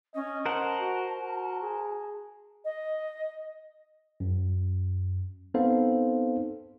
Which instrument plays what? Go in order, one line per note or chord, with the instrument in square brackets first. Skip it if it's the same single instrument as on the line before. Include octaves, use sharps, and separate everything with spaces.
[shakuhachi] C#4 [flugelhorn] D#5
[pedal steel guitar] A#4 C5 F#5 [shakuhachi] A5
[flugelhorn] F#4
F#4
G#4
[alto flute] D#5
[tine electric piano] F#2
B3 C4 D#4 A4 C5 F5